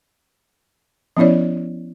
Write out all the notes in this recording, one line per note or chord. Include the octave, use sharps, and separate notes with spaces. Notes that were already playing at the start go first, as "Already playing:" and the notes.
F3 B3 C#4 E4 C#5 D5